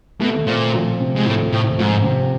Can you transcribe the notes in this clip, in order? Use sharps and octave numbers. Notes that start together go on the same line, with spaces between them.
B2 A3
A#2 C4
F3
C3
G#2
A2 A3
A2 C4
G#2 F3
C3